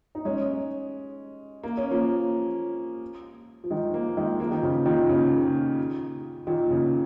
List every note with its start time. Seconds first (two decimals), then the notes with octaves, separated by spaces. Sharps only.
0.15 D#4
0.25 G#3 C#4
1.64 A#3
1.77 C#4
1.91 F3 A#3
3.64 F3
3.71 D#3 G#3
3.93 F3 A#3
4.17 D#3 G#3
4.40 F3 A#3
4.51 D#3
4.62 C#3 F3
4.86 A#2 D#3
5.09 C#3
6.47 A#2 D#3
6.70 C#3